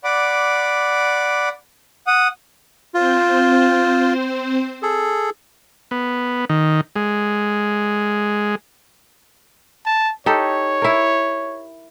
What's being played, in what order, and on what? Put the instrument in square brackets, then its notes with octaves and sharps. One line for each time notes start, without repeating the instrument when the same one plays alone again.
[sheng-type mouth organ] D5 F#5 B5 D6
F#5 D#6
[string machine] C4 C5 [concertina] F4
[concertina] G#4 A4
[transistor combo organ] B3
D#3
G#3
[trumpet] A5
[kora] D#4 G4 A4 [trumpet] C#5
[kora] E4 A#4